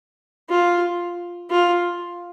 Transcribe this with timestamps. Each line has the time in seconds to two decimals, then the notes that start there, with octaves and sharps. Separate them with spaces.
0.49 F4
1.50 F4